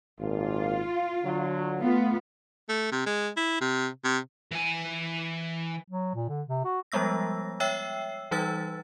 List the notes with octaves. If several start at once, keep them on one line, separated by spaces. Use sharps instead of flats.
G#1 A#2 F4
D3 F#3
A3 B3 F4
A3
C3
G#3
E4
C3
C3
E3 G#5
F#3
A#2
D3
C3
F#4
F3 G3 G#3 B3 E6 A#6
C#5 E5 G5 E6 C7
E3 G3 D#4 B4 E6 A6